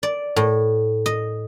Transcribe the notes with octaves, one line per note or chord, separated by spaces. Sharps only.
D5
A2
D#5